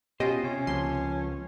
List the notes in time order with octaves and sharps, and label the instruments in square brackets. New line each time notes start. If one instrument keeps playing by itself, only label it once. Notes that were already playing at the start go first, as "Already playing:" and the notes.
[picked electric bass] B2 [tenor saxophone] C#4 [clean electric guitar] F4 C5 [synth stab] G4 D#5
[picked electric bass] C3 [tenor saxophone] C#4
[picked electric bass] C#2 [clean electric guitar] F3 A#3 C4 [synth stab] C6